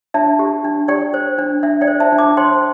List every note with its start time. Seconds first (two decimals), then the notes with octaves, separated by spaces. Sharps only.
0.14 D4 E5 A5
0.39 G4
0.65 D4
0.88 G4 D5 G5
1.14 C5
1.39 D4
1.63 D4 E5
1.81 D5 G5
1.87 C5
2.00 E5 A5
2.12 D4
2.18 A5 D6
2.37 C5 G5 C6